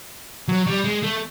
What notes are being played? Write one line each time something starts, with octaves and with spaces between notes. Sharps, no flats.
F#3
G3
G#3
A3